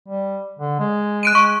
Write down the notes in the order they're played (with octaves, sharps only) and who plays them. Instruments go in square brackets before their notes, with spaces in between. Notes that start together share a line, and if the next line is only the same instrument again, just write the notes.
[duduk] G3
D3
G#3
[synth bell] F#6 D7 D#7
[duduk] G#3 [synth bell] C#6